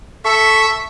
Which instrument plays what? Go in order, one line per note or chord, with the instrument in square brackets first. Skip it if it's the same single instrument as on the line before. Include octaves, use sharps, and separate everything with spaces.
[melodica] A4 C#6 [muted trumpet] E5